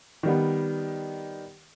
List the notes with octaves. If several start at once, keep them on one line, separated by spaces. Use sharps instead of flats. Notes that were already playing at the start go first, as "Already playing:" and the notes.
D#3 G3 B3